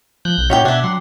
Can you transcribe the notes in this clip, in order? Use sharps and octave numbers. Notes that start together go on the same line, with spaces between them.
F3 F#6 G6
B1
A#2 E3 C#4 F#4 G4 C#5 G5
B2 D4 G4 E5 F#5 G#6
F#3 F#5 C6